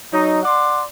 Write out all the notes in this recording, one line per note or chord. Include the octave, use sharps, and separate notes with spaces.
F#3 D#4
D5 F#5 C6